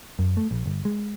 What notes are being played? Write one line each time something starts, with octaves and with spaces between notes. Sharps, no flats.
F#2
A3
A#1
G1
G#3